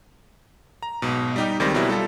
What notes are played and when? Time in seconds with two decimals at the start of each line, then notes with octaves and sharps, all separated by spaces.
0.83 A#5
1.02 B1 G#2 B2
1.36 G3 D#4 G4
1.60 C#2 D#3 G3 G#3 C4 A#6
1.74 B2 F#3 G3 C4 E4
1.90 G3 F4 A4